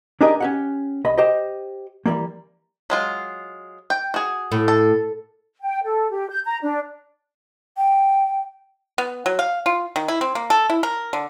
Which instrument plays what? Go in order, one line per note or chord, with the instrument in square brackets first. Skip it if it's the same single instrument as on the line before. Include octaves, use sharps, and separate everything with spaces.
[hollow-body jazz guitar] D4 D#4 G4 G#4 A#4 D#5
C#4 G4 F#5
C2 D#5 B5
G4 C5 D#5
E3 F#3 G3 A#3
[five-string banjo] F#3 G#3 F4
G5
F#4 G#4
[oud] A2
[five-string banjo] A4
[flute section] G5
A4
G4
G6
A#5
D4
[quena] G5
[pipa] B3
F#3
F5
F4
D#3
E4
C4
A#3
A4
E4
A#4
D3